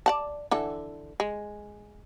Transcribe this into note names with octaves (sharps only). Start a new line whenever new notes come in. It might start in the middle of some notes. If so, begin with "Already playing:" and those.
D5 F#5 A5
D3 E3 A4
G#3